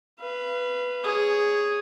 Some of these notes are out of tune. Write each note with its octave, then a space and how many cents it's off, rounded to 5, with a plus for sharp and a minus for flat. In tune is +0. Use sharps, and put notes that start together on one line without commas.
B4 +0 F5 -35
G#4 -5 C#5 +0